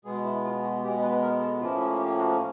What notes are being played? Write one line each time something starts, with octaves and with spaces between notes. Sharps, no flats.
B2 G#3 B3 G#4
E4
F4
F#4
B2 G#3 B3 G4
B4
A#4
A4
A2 F3 A#3 C#4 E4 F4
E4
G4
F#4